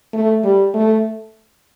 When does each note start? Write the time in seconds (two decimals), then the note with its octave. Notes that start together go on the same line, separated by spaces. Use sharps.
0.13 A3
0.44 G3
0.74 A3